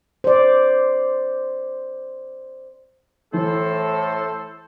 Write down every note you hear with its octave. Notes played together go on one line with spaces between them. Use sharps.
C5 D5
A2 E3 A4 C5